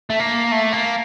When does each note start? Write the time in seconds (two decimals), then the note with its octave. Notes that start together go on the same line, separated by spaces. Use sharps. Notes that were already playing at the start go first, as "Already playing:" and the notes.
0.10 A3
0.19 A#3
0.52 A3
0.73 A#3